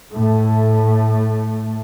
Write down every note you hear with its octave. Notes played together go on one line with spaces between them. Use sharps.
A2 A3